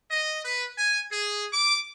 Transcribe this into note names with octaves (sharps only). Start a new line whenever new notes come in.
D#5
B4
G#5
G#4
D6